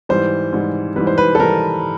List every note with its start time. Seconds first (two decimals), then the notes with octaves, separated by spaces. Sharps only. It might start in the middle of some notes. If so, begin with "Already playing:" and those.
0.09 G#2 E3 G3 C5
0.53 G#2 E3 G3
0.96 G#2 E3 G3 B4
1.07 C5
1.18 B4
1.35 A4
1.39 G#2 E3 G3 A#4